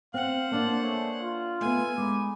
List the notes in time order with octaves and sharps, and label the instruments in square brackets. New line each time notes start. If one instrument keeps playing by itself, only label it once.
[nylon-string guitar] C4 [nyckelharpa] C5 F#5 [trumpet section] F5
[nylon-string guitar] A#3 D4 [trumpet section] F4 D5 A5
[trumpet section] G#3 A3 C#5
F4
[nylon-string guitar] A3 B3 [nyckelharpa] G#5
[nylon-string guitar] G#3 [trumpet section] D#4 B5 D6